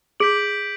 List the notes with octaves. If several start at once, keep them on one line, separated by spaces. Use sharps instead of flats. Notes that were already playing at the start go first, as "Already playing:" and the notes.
G#4 G6 B6 D7 F#7